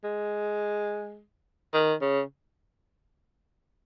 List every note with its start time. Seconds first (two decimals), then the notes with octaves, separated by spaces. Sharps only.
0.04 G#3
1.74 D#3
2.02 C#3